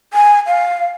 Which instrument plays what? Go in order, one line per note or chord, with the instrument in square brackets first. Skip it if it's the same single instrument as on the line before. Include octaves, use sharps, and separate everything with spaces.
[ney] G#5
F5